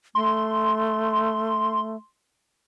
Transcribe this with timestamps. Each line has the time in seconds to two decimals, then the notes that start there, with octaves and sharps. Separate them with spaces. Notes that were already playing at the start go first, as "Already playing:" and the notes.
0.15 A3 C6